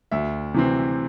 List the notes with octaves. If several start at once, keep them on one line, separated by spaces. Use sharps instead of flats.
D2 E5
C3 E3 C4